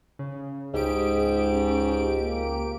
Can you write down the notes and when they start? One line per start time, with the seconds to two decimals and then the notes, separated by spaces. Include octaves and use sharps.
0.19 C#3
0.74 C#2 G#2 G4 G#4 D7
1.52 C#4
2.20 A#3